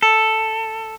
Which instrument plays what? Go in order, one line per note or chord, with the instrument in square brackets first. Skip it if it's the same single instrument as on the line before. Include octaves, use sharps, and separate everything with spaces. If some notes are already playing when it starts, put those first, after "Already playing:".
[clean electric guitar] A4